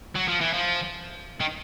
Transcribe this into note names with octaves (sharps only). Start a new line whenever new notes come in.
F#3
F3
E3
F3
D#3